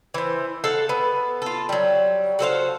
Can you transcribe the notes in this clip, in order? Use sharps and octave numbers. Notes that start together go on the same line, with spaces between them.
E3 C5
A4 F5 F#5 A5
B3
F4 A4
F#3 G3
F#4 A4 C5 F5